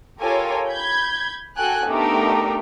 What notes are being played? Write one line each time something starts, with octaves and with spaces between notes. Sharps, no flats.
F4 G4 A4 A#4 C#5 G#5
B5 G6 G#6
F#4 A4 G5 G#5 F#6
A3 B3 D4 D#4 G4 A#4